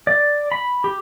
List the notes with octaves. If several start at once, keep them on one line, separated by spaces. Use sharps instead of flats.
D5
B5
G4